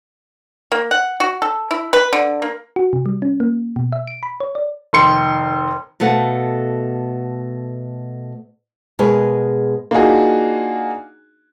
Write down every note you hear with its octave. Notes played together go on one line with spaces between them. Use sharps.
A#3
F#5
F#4
A4
E4
B4
D3
A#3
F#4
C3
G3
C#4
A#3
B2
E5
D7
B5
C#5
D5
F1 D#3 C6 C#7
B2 A3 A4 B4 F5 F#5
B2 G#3 G#4 A#4 B4
A#3 D4 D#4 F4 F#4 G#4